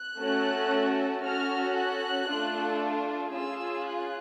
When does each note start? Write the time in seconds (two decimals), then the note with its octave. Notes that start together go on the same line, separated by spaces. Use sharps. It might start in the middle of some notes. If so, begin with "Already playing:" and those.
Already playing: F#6
0.18 A3 C#4 F#4 A4
1.23 C#4 F#4 A4 F6
1.76 F#6
2.28 A3 D4 F4 A4
3.34 C#4 F4 G#4 E6
3.86 F#6